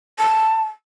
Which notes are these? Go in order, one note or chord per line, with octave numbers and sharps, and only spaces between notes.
A5